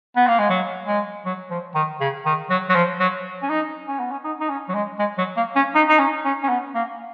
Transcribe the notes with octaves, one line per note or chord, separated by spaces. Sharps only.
B3
A#3
G#3
F#3
G#3
F#3
F3
D#3
C#3
D#3
F#3
F#3
F3
F#3
C#4
D#4
C#4
B3
C#4
D#4
D#4
C#4
F#3
G#3
G#3
F#3
A#3
C#4
D#4
D#4
C#4
C#4
C#4
B3
A#3